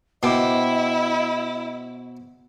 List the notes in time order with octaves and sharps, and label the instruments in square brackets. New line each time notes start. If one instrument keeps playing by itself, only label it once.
[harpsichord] B2 [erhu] E4 [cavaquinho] C5 G5 D6 [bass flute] D#5